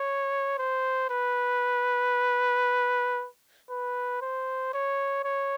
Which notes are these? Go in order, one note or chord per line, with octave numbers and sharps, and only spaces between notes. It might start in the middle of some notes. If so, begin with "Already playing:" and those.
Already playing: C#5
C5
B4
B4
C5
C#5
C#5